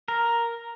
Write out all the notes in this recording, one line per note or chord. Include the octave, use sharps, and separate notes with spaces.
A#4